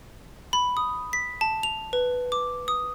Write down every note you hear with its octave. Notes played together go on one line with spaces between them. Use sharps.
B5
D#6
B6
A5
F7
B4
D6
D#6